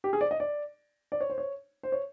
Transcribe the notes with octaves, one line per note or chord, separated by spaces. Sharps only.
G4
G#4
D5
D#5
D5
D5
C#5
C5
C#5
C5
C#5